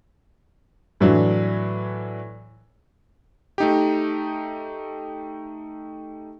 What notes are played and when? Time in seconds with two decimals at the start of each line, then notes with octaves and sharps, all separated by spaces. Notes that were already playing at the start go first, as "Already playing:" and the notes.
1.01 A2 E3 F#3 D4
3.58 A3 D#4 G4